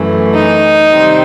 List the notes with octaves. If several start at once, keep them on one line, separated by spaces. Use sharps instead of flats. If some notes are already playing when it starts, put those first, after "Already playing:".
Already playing: F#2 E3 A3
D#4
C3 D#3 G3 C4